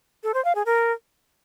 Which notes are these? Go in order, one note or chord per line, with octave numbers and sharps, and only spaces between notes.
A4
C5
F5
G#4
A#4